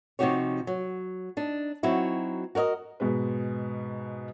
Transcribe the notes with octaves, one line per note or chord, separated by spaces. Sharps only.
C3 F3 D#4 F#4 G4 C#5
F#3
D4 D#4
F#3 C4 D#4 E4 F#4
F#4 A#4 C#5 D#5
G#2 B2 G#3 B4